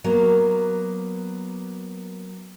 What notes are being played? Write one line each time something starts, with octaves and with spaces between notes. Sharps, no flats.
F#3 A#3 B3